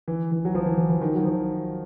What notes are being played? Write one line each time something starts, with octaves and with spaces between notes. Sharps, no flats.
E3
E3
F#3
F3
E3
E3
E3
D#3
F#3
F3